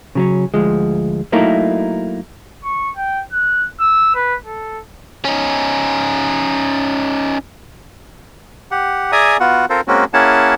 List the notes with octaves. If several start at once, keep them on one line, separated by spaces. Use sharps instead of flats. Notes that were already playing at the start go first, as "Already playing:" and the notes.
C#3 F#3 C#4
D2 F3 G#3
F#3 A3 A#3 D#4 E4 A#4
C#6
G5
F#6
E6
B4
A4
C#4 D#4
G4 F#5
G#4 D5 E5 G#5 A#5 D#6
B3 F4 F#4 F#5
C4 F4 A4 A#4 C5
G#3 A#3 C4 C#4 F#4
A#3 C#4 E4 G#4 F#5 A5